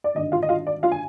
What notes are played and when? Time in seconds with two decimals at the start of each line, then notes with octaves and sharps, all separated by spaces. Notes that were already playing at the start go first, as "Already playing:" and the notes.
0.04 D5
0.15 G#1 G2 D3 D#5
0.32 F4 F5
0.43 D#5
0.49 F4 F5
0.67 D5
0.83 F4 F5
0.92 G#5